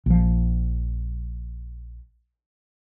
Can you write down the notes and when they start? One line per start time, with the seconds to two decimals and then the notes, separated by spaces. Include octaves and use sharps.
0.06 A#1 F3